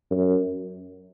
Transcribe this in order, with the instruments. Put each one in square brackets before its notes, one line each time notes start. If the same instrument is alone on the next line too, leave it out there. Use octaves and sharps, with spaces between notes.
[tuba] F#2